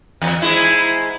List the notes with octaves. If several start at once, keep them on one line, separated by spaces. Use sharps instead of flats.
E2
G#2 G#3 E4